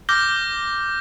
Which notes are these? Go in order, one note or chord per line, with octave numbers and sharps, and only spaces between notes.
D6 F6 G6 A#6 G7